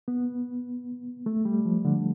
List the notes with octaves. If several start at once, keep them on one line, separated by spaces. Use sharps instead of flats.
B3
A3
G3
F3
D3